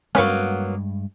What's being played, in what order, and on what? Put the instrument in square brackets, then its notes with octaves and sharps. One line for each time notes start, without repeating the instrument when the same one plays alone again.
[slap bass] G2 G#3 [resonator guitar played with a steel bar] F#3 A#3 B3 [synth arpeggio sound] C#4 B4 C#6